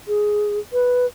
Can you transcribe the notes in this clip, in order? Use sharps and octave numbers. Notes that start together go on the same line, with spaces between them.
G#4
B4